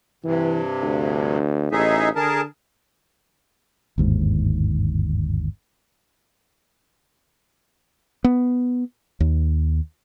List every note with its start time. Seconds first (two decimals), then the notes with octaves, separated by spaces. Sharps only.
0.24 G2 C3 E3
0.83 D2
1.72 A1 D#4 G#4 E5
2.16 D3 G#4 A#4 A5
3.98 G1 D#2 G#2
8.24 B3
9.20 D#2